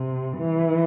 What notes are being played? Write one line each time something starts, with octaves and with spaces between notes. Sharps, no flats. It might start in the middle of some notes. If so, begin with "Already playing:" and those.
Already playing: C3
E3